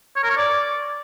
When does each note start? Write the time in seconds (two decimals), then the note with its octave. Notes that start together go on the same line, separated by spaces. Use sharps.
0.16 C#5
0.23 A#4
0.30 C#5
0.37 D5